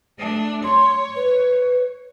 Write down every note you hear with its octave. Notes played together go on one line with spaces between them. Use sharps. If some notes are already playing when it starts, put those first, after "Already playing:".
A3 D4
C#5 C6
B4